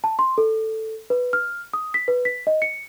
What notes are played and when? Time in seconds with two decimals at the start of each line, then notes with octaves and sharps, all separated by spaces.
0.04 A5
0.19 C6
0.38 A4
1.10 B4
1.33 F6
1.74 D#6
1.94 B6
2.08 B4
2.25 B6
2.47 D#5
2.62 C#7